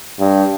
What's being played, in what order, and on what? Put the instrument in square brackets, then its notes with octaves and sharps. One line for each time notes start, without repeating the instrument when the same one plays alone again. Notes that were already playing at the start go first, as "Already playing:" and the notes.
[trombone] G2